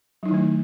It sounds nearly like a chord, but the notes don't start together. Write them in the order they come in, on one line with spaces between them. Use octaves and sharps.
F#3 D#4 E4 D#3 A3